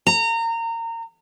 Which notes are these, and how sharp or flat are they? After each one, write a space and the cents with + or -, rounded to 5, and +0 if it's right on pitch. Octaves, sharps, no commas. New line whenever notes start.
A#5 -25